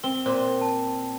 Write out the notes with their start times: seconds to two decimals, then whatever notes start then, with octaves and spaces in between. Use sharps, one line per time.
0.04 C4 G7
0.26 A#2 C5 C6
0.61 A5